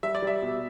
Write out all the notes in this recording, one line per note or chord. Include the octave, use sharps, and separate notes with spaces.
G3 E5
D5
G3 E5
B2